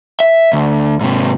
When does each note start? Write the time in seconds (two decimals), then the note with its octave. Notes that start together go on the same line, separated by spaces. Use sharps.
0.20 E5
0.53 D2
1.01 G#2 C3